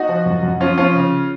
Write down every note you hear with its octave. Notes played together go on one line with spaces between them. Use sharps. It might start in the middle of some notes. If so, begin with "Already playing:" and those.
Already playing: D#4 F#4
F3
F#2
F#2
F3 C#4 F4
F3 C#4 F4
C#3